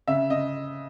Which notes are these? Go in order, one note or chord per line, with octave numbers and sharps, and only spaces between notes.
C#3 E5
C#3 D#5